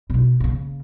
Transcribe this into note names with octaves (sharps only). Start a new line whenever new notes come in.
B2 D#4
C#3 A#3